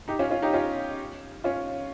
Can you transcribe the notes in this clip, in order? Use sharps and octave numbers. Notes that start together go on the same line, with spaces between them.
D#4 G4
C#4 F4
C#4 F4
D#4 G4
C#4 F4
C#4 F4